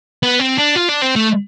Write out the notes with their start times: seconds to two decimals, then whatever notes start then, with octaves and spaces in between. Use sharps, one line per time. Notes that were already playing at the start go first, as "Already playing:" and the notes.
0.23 B3
0.39 C4
0.58 D4
0.75 F4
0.89 D4
1.02 C4
1.16 A3